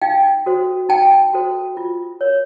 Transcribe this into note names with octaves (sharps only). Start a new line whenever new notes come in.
D#4 F5 G5
F#4 A4 C5
D#4 G5 A5
F#4 A4 C5
F4
A#4 C#5